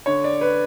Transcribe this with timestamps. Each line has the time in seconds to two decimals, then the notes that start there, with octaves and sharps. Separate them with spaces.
0.06 D3 C#5
0.24 D5
0.41 B4